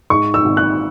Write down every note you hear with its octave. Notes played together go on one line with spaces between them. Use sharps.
G#2 C#6
E6
G#1
F#6